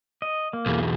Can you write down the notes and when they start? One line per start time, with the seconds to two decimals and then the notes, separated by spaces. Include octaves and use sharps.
0.22 D#5
0.53 A#3
0.66 B1 E2